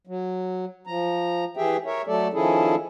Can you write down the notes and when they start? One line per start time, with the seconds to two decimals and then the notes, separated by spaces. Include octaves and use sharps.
0.07 F#3
0.87 F3 A#5
1.57 E3 G4 G#4 E5 G5
1.86 A#4 C#5 E5
2.07 F#3 A3 A4 D5
2.33 D#3 F3 C#4 E4 G#4 A4